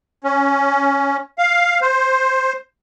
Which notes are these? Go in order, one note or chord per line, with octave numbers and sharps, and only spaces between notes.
C#4
F5
C5